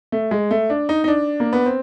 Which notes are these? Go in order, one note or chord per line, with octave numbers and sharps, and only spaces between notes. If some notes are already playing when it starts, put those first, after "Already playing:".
A3
G#3
A3
D4
D#4
D#4
D4
A#3
B3
C4